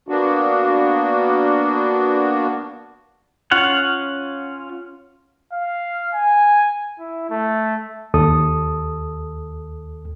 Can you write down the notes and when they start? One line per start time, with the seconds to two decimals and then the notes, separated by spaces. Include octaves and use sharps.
0.08 A#3 B3 D4 F#4
3.51 C#4 F4 F5 F#5
5.53 F5
6.14 G#5
6.99 E4
7.30 A3
8.14 D#2 A4 D#6